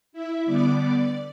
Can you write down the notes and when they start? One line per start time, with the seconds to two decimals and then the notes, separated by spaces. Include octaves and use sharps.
0.13 E4 E5
0.45 D3 G3 B3 D5 D6
0.78 D5 D6